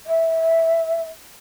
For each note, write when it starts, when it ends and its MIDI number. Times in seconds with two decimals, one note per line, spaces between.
0.07 1.06 76